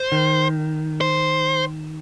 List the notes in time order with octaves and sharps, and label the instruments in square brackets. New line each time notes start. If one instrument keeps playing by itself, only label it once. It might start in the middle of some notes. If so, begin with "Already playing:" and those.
Already playing: [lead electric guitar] C5
[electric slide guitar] D#3
[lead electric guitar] C5